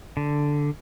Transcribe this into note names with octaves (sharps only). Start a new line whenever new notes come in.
D3